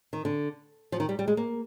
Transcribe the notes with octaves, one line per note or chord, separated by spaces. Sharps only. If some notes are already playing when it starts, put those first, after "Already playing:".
D#3
D3
F3
D#3
G3
G3
G#3
A#3